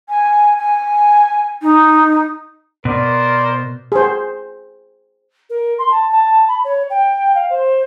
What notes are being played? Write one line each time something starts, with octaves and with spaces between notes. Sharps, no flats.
G#5
G#5
D#4
B2 A#4 C5 D5
G#4 C5
A#4
C6
A5
A5
B5
C#5
G5
F5
C5